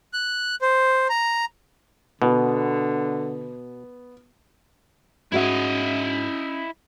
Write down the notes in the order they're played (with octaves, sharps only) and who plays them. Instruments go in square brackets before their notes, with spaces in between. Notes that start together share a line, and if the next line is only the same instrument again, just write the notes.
[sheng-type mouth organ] F#6
C5
A#5
[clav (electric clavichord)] B2 [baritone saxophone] D3 [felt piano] B3
[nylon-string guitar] G#2 F#4 E5 [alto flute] C#4 [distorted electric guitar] E4 D#5